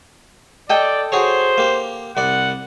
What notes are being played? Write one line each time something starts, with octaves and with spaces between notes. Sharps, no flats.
A4 D5 D#5 G5
F#4 G#4 C5 C#5
A#3 G4
C2 D5 F#5